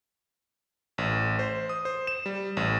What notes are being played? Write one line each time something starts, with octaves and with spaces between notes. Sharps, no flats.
A1
C5
D#6
C5
E7
G3
A1